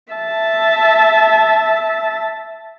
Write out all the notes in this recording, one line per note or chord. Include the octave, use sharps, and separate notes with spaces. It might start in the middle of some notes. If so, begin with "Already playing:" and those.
E5 A5